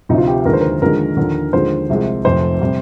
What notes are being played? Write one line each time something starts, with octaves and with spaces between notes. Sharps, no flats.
D2 C3 F3 D#4
F4
G4
D#2 D3 F3 G#3 A#4
C5
A#4
D#2 D3 F3 G#3 A#4
D#2 D3 F3
D#2 D3 F3 G#3 C5
C2 C3 F3 G#3
F1 F2 C3 C5
C3 G3